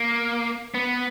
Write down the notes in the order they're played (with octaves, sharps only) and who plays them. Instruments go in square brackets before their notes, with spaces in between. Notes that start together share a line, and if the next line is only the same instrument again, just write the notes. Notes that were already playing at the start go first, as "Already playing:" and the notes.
Already playing: [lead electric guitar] A#3
B3